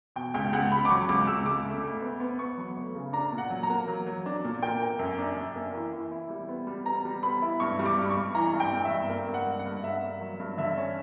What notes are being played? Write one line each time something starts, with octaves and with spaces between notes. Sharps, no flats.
B2 G5
C#2 G5
C#2 F#5
C#2 B5
D6
F#3 C#6
C#2 D6
C#2 E6
C#2 D6
D2
D2
B3
B3
B3 C#6
F#3
D2
C#3
D4 A#5
A#2
F#5
F#3
A#5
A#3
F#3
F#3
D4
A#2
A#3 G5
A#3
F#2
D4
F#2
A#3
E3
E3
E4
G3
B3
G3
B3 A#5
G3
B3 B5
E4
G2 C#6
G3
D6
G2
C#6
G2
E3 A#5
G2
G5
G2
E5
G2
A#3
G2
F#5
G2
F#5
G2
G2 E5
A#3
F#3
G2
D3 E5
C#4